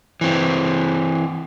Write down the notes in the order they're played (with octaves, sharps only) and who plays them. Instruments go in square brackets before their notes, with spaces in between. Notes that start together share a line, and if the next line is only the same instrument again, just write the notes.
[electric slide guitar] E3 C4